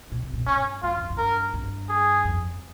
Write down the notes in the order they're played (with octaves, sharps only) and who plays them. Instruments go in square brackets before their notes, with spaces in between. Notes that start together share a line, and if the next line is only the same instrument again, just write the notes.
[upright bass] A#2
C3
A#2
[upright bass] G2 [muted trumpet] C#4
[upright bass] G2 [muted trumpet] F4
[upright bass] F2
G2
[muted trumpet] A#4
[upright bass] G2
[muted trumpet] G#4
[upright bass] F2